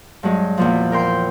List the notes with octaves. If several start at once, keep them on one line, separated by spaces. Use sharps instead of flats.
G2 F#3 G#3
E2 A#2 F3
A#4 G5 C6 G6